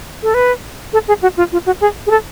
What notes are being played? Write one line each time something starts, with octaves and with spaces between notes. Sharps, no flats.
A4
B4
A4
G#4
F#4
F4
F4
F#4
G#4
G#4
A4